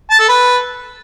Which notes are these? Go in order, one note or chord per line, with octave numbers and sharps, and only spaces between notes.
A5
A4
B4